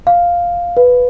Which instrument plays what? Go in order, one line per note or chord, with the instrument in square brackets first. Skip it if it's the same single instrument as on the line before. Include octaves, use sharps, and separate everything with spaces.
[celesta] F5
B4